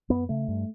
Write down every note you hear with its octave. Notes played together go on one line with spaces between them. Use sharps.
F#2 B3
C#3 A3
G2